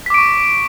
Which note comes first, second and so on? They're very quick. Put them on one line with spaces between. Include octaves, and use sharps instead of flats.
B6 D6 D7 C#6